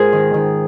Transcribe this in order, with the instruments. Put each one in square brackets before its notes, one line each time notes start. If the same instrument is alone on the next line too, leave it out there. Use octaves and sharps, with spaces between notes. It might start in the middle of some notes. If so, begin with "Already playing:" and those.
Already playing: [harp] G#2 F4 G#4 A#4 C5
D#3
D#3